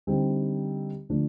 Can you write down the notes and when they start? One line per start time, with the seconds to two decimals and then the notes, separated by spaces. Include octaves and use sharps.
0.07 D3 G3 C4 D#4
1.09 D3 F3 A3 D4